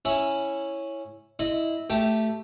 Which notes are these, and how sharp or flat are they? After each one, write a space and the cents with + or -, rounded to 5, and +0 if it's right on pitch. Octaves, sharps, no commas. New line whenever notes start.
C#4 -5 E4 +0
E4 -15 D#5 -20 C6 +0
A3 +0 G4 -10